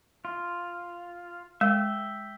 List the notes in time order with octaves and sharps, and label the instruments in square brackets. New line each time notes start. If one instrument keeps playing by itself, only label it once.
[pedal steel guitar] F4
[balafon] G#3 [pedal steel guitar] E5 G5